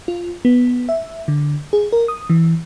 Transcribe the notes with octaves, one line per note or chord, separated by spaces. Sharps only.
F4
B3
E5
D3
G#4
A#4
D#6
E3